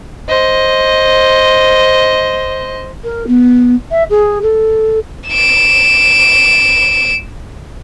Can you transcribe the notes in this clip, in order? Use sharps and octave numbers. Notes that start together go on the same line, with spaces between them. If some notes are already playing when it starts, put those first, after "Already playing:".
C5 D#5
A#4
B3
E5
G#4
A4
D7 E7